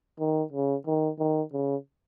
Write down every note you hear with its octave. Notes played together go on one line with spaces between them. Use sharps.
D#3
C#3
D#3
D#3
C#3